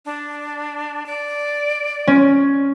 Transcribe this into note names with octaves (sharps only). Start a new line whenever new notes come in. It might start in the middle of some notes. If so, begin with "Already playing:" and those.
D4
D5
C#4